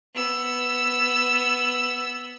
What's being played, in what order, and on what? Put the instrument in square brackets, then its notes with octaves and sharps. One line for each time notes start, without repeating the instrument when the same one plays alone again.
[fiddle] B3 E6